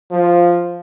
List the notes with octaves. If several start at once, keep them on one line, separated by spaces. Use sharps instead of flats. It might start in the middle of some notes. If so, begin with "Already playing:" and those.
F3